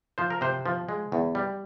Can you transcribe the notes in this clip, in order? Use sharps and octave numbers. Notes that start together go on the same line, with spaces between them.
F3 C5
A#4
C3 C5
F3
G#3
E2
G3